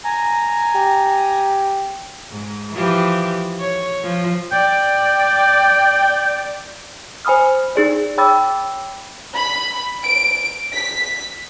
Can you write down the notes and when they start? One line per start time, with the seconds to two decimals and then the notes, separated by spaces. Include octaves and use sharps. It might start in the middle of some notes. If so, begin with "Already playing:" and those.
0.04 G#5 A#5
0.75 G4
2.31 G#2
2.73 E3 F3 G4
3.59 C#5
4.03 F3
4.52 D5 G5
7.25 C5 G#5 B5 D#6 F6
7.76 D#4 G#4 D5
8.18 C#5 G5 B5 D6 E6 A6
9.34 B5
10.04 D7
10.73 B6